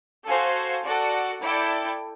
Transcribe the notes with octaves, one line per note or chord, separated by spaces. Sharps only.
F#4 A4 C5 F5 G#5
F#4 A4 D5 F#5
E4 A4 D5 G5